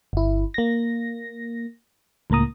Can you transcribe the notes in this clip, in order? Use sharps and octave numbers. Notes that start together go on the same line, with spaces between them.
G1 E4
A#3 A#6
C#2 A2 A#3 A#5 D#6